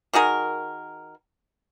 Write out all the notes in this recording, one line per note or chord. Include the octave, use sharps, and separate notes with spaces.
D#3 F#4 G#4 A#4